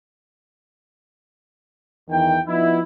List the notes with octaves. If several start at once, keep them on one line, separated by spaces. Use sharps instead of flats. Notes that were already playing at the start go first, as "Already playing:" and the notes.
E2 D#3 E3 G5
F3 B3 D#4 E4